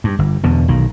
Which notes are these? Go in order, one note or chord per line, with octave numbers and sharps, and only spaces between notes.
G2
G1
E2 B2 D3
B1 D#3